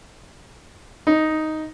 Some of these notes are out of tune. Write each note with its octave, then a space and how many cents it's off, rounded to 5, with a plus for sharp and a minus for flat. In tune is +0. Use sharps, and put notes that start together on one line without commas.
D#4 +5